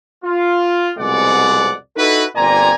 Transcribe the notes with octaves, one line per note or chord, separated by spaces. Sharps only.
F4
C2 F2 B2 G#3 D5 F#5
D#4 E4 F#4 A4 B4
G1 A#2 C4 D5 G#5 A#5